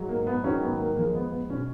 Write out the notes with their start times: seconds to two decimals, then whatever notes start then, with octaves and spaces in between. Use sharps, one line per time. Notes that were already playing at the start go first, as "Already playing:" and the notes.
Already playing: G#2 F#3
0.09 A#3
0.27 B3
0.44 G#2 D#3 F#3 C#4
0.62 B3
0.79 A#3
0.96 F2 F3 G#3 A#3
1.15 B3
1.32 B3
1.50 B2 C#4
1.53 F#3